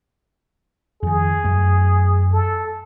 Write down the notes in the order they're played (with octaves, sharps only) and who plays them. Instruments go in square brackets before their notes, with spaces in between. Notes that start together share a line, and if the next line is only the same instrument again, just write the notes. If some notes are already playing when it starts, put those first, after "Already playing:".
[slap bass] F2 D#3 [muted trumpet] G#4
[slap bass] F#2 A3
[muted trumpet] A4